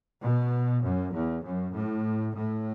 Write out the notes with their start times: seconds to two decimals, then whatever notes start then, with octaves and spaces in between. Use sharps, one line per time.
0.23 B2
0.83 F#2
1.14 E2
1.44 F#2
1.74 A2
2.34 A2